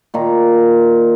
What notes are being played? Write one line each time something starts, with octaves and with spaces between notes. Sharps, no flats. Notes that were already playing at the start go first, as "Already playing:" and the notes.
A#2 D#3 A#5